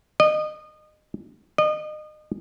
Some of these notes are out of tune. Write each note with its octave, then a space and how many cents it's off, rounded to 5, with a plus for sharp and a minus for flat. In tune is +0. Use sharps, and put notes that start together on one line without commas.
D#5 -25
D#5 -30